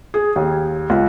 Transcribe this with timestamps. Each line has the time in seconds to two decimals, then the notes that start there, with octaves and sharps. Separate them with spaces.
0.14 G#4
0.36 D#2
0.90 C#2